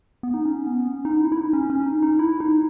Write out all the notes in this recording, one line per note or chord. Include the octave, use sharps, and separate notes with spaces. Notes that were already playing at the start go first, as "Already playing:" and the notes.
B3
D#4
C#4
B3
C#4
D#4
E4
E4
D#4
C#4
C#4
D#4
D#4
E4
D#4